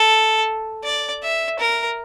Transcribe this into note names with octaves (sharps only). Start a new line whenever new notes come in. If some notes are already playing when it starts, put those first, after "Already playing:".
Already playing: A4
D5
E5
A#4